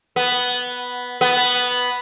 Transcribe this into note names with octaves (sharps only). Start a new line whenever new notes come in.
B3
B3